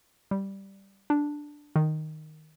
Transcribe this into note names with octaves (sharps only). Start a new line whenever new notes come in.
G3
D4
D#3